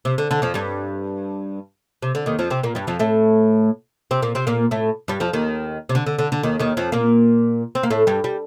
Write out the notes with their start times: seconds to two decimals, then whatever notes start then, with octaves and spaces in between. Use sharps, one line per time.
0.05 C3
0.18 D3
0.31 D3
0.42 F2 F3
0.54 G2 G3
2.02 C3
2.15 D3
2.26 D#2 D#3
2.39 F2 F3
2.50 C3 C4
2.63 A#2 A#3
2.75 G2 G3
2.87 F2 F3
2.99 A2 A3
4.11 C3 C4
4.22 A#2 A#3
4.35 C3 C4
4.47 A#2 A#3
4.71 A2 A3
5.08 G2 G3
5.20 F2 F3
5.33 D#2 D#3
5.89 C3
5.95 D3
6.06 D3
6.19 D3
6.32 D3
6.43 D#2 D#3
6.59 D#2 D#3
6.77 F2 F3
6.92 A#2 A#3
7.75 C4
7.83 A#3
7.90 A2 A3
8.07 G2 G3
8.24 G3